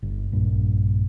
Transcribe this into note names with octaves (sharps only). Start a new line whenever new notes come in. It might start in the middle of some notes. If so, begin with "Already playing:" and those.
G1
A#1 G2